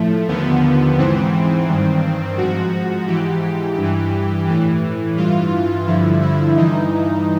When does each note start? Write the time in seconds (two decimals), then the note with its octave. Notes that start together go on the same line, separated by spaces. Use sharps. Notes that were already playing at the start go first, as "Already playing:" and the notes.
Already playing: A2 F3 A3
0.28 D#2 D3 F3 B3
0.98 G#2 E3 C4
1.68 G2 D#3
2.38 G#2 F3 F#4
3.07 G#2 E3 G4
3.77 G2 E3
4.47 A2 E3
5.17 G2 E3 F4
5.87 G2 D3 F3 E4
6.22 E4
6.57 G2 E3 D#4